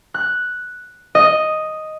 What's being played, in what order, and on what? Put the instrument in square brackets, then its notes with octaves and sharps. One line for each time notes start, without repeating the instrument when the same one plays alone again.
[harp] F#6
D#5